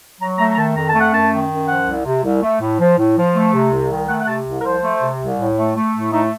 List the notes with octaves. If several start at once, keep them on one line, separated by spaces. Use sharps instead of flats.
F#3 A#5
A3 A#5
A#5
D#3 A5
F2 A#5
A5
A3
F#5
F#2 A5
D#3
F#2
F3 F#5
C2
C3
C2
A3
A2
F3
A2
F3
A3
C3
C2
D#3
A3 F#5
F#5
C3 A5
C2
A#4
F3 C5
A3
C3
C2
A2
A3
A3
A2
A3 D#4